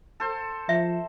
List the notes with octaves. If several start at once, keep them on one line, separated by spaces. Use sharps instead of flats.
A4 C5
F3 E5